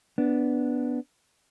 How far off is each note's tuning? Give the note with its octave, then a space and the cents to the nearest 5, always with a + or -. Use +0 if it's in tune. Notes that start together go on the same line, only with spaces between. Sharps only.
B3 +0 D4 -5